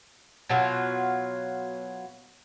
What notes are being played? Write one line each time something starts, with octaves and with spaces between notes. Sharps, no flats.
B2 F#3 F4